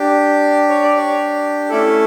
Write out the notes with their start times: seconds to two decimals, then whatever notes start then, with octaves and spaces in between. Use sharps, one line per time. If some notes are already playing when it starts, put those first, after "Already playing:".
Already playing: D4 G4
0.69 C#5
0.83 D5
0.97 C#5
1.69 A3 C#4 E4 A4 D5